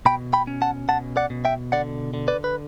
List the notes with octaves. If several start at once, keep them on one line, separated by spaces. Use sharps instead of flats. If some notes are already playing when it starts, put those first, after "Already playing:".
B2 G5 B5
G5 B5
C#4
F#5 A5
B2 F#5 A5
D5 F#5
B2
E5 G5
D3 D5 F#5
D3
B4 D5
B4